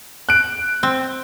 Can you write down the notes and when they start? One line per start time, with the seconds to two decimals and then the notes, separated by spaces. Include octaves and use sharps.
0.29 F#6 D7
0.83 C4